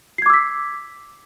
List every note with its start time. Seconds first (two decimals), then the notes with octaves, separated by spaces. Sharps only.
0.18 C7
0.22 G#6
0.26 D6
0.30 E6
0.34 B6